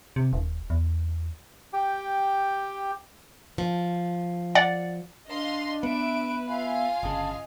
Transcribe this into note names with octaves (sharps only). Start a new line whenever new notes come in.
C3
D#1
E2
G4 G5
F3
D5 F#5
D4 D#5 F5 C6
B3 B4 E5 D7
F4 E5 F5 G#5
G1 C#3 D#5 A5